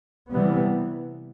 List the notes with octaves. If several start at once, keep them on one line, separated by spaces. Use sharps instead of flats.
C3 E3 G3 B3